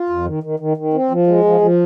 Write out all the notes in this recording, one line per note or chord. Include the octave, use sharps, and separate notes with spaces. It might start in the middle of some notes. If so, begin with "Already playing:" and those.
Already playing: F4
F2
D#3
D#3
D#3
D#3
C4
F3
G#3
F3
F3